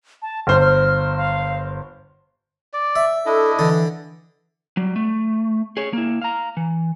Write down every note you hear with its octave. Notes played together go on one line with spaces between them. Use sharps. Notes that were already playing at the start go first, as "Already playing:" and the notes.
A5
G1 C5 F6
F6
F5
D5
E5
D4 E4 A4 D#5
D3 E3
F#3 G3
A3
G#4 C#5
A#3 E4
F5 A#5
E3